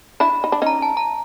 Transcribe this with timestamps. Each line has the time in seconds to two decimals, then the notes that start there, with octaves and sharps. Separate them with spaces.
0.20 D4 E4 B5
0.44 D#4
0.52 D4
0.62 C#4 D#4 A#5
0.82 A5
0.97 A#5